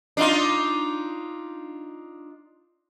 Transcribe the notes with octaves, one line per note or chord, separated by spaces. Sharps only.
D4 D#4 F4